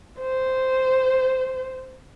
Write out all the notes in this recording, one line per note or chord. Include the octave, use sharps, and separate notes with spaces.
C5